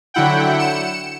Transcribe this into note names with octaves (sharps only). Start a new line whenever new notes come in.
D3 F#3 E4 F#5 G5
C#7 E7